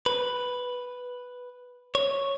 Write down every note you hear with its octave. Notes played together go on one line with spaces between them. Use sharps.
B4
C#5